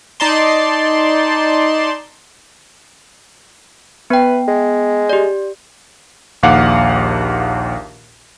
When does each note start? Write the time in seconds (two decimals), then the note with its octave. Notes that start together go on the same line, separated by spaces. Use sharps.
0.20 D#4 D5 A5 C6
4.10 B3 B4 G5
4.48 G#3
5.10 G4 D5
6.43 A#1 D#2 F5 F#5 D6